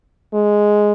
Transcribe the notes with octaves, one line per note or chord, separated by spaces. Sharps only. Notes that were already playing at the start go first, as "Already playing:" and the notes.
G#3